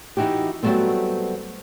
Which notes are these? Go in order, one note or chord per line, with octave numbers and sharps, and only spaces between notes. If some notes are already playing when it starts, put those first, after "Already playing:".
E3 D#4 E4 F#4 G4
F#3 G3 A3 B3 C4